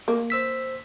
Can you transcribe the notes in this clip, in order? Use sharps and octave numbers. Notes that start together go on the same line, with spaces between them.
A#3
C5 E6 B6